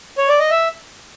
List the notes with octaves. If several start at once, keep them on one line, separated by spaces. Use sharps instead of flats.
C#5
D5
D#5
E5